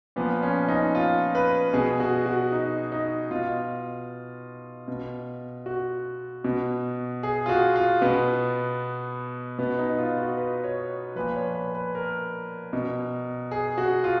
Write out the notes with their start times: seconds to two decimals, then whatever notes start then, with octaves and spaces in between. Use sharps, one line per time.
0.16 A#2 F3 B3
0.43 C#4
0.68 D#4
0.95 F4
1.35 B4
1.73 B2 G#4
2.00 F#4
2.26 F#4
2.52 D#4
2.92 D#4
3.31 B2 F4
4.88 B2
5.66 F#4
6.44 B2
7.23 G#4
7.46 F4
7.49 F#4
7.76 F4
8.01 B2 B3
9.59 B2 B3
9.79 D#4
9.98 F4
10.18 F#4
10.37 B4
10.64 C#5
11.16 A#2 F3 B4
11.35 C#5
11.55 B4
11.74 B4
11.95 A#4
12.73 B2
13.51 G#4
13.78 F#4
14.04 F4